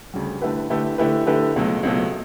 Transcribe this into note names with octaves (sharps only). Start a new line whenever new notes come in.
D2 C#3 G3
D3 A3 E4 G4 B4
D3 A3 E4 G4 B4
D3 A3 E4 G4 B4
D3 A3 E4 G4 B4
C#2 B2 F#3 A3
C#2 B2 F#3 A3